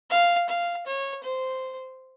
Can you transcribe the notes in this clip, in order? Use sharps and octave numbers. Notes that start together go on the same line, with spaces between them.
F5
F5
C#5
C5